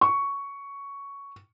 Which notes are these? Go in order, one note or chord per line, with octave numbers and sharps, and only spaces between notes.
C#6